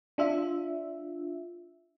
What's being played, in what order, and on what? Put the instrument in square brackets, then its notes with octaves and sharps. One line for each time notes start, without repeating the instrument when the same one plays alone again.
[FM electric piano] D4 F4 E5